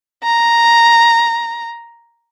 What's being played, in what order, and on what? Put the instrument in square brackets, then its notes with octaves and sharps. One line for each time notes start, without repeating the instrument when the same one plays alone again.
[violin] A#5